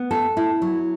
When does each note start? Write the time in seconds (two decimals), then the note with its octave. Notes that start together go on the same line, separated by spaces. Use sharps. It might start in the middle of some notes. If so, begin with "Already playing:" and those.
Already playing: B3
0.11 A4
0.37 E4
0.62 F#3